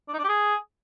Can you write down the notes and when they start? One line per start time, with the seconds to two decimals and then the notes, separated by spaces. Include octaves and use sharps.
0.08 D4
0.13 D#4
0.18 D4
0.24 G4
0.29 G#4